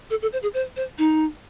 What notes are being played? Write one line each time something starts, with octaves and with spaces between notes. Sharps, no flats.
A4
A4
C5
G#4
C5
C5
D#4